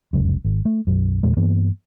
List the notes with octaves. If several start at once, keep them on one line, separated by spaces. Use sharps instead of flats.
F1 C#2 F#2
G#1
A3
B1 F#2
E2 A#2 G#3
G2 E3 A#3 B3